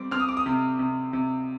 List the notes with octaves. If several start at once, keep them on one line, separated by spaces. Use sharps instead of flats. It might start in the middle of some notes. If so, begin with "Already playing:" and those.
Already playing: G3 C4 D6
C4 F6
D#6
D6
D#6
C3
C3
C3